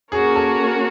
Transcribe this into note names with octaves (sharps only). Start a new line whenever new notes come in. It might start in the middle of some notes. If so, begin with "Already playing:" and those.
A#3 C#4 F#4 G#4 A#4 C#5
A4